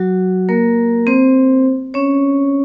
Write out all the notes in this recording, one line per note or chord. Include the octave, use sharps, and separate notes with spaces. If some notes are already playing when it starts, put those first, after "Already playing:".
Already playing: F#3 F#4
A#3 A#4
C4 C5
C#4 C#5